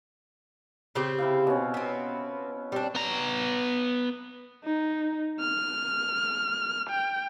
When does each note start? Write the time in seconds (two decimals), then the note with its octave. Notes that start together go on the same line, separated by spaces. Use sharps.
0.95 C#3 C4 G4
1.18 C3 E4 F5
1.47 B2 C#4
1.74 B3 C4
2.72 G3 C4 D4
2.95 B3 A#5
4.64 D#4
5.39 F6
6.89 G5